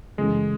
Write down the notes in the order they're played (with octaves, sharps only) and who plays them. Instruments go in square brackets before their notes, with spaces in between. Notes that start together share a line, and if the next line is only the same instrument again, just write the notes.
[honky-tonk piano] F#1 F#2 E3 A3 C#4 [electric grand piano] G#3